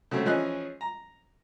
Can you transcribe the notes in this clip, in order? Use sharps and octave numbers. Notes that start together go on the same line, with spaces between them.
C#3 F#3 A3 C4
E3 F3 C#4 G#4 D#5 F#6
A#5